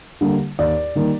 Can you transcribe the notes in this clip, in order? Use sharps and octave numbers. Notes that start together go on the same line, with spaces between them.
D3 G3 A#3
D#2 D5
D#3 G3 A#3